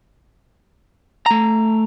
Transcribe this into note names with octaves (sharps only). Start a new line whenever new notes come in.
A3 A#5